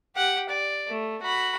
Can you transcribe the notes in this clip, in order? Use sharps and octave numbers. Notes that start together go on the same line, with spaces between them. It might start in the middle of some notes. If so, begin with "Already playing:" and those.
G4 F#5
D5
A3
F#4 B5